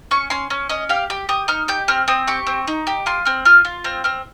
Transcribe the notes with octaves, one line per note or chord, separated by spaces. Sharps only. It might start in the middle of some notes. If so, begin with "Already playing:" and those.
C#4 C#6
C#4 C6
C#4
C#4 D#5
G4 F5
G4
G4 D#6
D#4 F6
G4 G6
C4 F6
C4 D#6
G4 C#6
C4
D#4
G4
F4 C6
C4 F6
F4 F6
F4
C4 F6
C4 F6